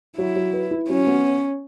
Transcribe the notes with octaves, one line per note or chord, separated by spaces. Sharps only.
F#3 E4
F#3
B4
E4
F#3 C#4
B3